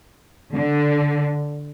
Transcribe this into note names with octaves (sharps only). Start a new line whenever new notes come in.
D3